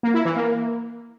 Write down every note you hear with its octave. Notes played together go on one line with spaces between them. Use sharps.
A#3
E4
E3
A#3